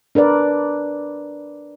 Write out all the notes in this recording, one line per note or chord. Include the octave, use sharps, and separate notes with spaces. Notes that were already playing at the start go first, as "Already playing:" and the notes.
D4 A#4 B4 D5